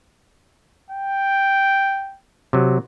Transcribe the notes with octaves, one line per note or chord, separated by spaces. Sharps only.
G5
C3 F#3